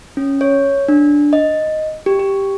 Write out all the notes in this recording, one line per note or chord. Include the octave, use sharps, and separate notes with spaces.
C#4
C#5
D4
D#5
G4
G4